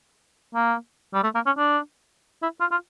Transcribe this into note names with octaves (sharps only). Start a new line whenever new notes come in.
A#3
G3
A3
A#3
C#4
D4
E4
F4
F4